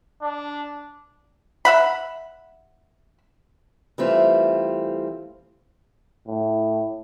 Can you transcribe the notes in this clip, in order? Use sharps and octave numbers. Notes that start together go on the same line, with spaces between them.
D4
E5 F#5 B5
E3 G3 A3 C4 F4
A2